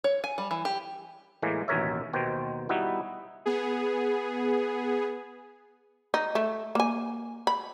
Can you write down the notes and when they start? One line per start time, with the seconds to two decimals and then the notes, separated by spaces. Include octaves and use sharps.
0.04 C#5
0.24 G#5
0.38 G3
0.51 E3
0.65 G4
1.42 A2 E3 G#3 A#3
1.68 A1 D#2 B2 A#4 C#5 E5
2.13 D#2 B2 D#3 C5 G5
2.69 G3 B3 D#4 E4 F#4 B4
3.46 B3 G#4
6.14 D#4
6.35 A3
6.75 A#3 G#5
7.47 B5